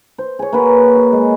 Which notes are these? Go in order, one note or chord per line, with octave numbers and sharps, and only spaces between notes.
C5
G#4 C#5
A#3 F#4 B4
F#4
G#3